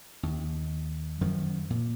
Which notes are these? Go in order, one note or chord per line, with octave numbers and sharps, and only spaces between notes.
D#2
F#2 D#3 F3
A#2